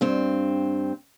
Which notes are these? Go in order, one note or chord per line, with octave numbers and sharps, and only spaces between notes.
G2 C4